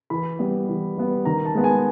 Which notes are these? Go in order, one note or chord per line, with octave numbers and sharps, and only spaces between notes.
E3 B5
G3 B3
E3
G3 B3
D#3 A#5
A5
G#3 B3
G#5